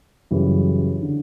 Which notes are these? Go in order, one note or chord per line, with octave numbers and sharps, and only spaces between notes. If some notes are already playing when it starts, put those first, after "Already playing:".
F#2 C#3 E3 G3
D3